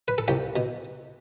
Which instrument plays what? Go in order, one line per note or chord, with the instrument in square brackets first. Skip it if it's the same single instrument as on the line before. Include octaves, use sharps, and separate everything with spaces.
[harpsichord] B4
A4
C2 G4
B2